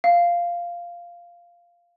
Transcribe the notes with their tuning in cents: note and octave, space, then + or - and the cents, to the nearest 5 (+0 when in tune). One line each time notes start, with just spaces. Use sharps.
F5 -5